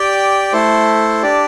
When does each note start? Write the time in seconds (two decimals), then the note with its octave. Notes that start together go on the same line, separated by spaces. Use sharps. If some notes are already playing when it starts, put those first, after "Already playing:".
Already playing: G4 D5 G5
0.53 A3 E4 A4 C5
1.23 D4 G4 D5 A5